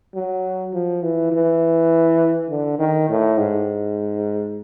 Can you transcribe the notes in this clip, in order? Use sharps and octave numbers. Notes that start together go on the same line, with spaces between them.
F#3
F3
E3
E3
D3
D#3
A2
G#2